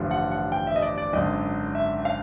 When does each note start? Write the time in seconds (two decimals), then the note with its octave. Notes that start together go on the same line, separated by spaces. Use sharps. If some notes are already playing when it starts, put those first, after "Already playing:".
Already playing: A1 G2 D3 F3
0.11 F#5
0.32 F#5
0.52 G5
0.67 E5
0.76 D#5
0.82 D5
0.98 D5
1.13 G#1 F#2 D3 D#5
1.75 E5
2.05 F5